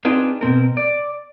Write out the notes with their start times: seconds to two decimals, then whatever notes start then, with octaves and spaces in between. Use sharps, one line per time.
0.05 C4 D4 D#4 F4 G#4 B4
0.41 B2 C4 A#4
0.77 D5